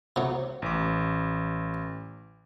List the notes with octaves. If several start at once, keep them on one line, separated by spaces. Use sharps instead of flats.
C3 F#3
A1 D6